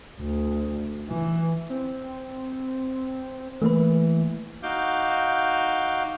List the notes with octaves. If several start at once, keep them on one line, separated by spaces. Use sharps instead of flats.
D2
E3
C4
E3 A3 A#3 B4
D#4 F#4 F5 D6 G6